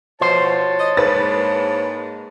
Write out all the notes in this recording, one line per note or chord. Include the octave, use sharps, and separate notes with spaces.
B2 F3 C5 C#5 A5
D#5
G#2 G#3 A#3 B4 A6